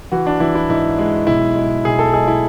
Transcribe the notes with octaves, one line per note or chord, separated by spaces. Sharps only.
E3 F#4
D4
E3 E4
E4
G#2 E4
G#3
B1 E4
G#3
B1 G#4
A4
G#3 G#4
E4